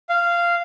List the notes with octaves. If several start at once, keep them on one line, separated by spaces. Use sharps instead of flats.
F5